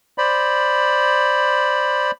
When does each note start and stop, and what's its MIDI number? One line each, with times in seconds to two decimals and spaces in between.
0.18 2.11 72
0.18 2.11 74
0.18 2.11 83